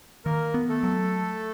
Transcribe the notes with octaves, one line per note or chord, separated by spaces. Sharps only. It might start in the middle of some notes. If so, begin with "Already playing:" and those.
D#3 A#3 A#4
B3
A3 A4
F#3